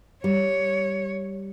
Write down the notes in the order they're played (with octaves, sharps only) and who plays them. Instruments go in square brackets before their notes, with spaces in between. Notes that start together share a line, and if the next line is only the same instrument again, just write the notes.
[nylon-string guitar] G3 [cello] C#5